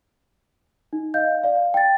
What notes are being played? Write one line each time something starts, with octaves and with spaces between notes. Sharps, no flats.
D#4
D#5 F5 G6
D5 F5
G5 A6